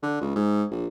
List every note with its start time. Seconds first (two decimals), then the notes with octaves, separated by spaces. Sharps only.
0.03 D3
0.21 C#2
0.36 G#2
0.71 A#1